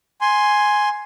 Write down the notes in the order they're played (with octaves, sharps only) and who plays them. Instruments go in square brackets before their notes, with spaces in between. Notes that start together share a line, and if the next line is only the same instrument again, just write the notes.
[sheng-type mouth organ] G#5 C6